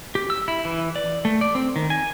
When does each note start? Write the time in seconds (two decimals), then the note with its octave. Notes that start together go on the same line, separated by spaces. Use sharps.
0.15 G4
0.30 E6
0.48 E4
0.65 E3
0.96 D5
1.25 A3
1.41 D5
1.55 C4
1.76 D#3
1.90 G#5